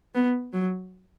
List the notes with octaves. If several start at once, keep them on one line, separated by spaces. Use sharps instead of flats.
B3
F#3